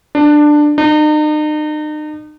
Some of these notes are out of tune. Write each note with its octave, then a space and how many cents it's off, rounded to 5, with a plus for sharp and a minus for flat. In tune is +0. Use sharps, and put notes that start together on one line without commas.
D4 +15
D#4 -40